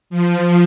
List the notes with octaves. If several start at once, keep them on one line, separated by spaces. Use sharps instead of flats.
F3